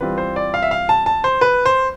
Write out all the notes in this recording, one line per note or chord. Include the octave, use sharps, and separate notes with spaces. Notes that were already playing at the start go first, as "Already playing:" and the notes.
E3 G3 C4 F4 B4
C5
D5
F5
E5
F5
A5
A5
C5
B4
C5